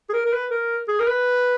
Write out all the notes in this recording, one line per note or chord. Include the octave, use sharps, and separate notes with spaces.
G#4
A#4
A#4
B4
A#4
G#4
A#4
B4